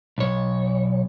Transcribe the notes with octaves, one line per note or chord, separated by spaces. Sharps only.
B1 C#5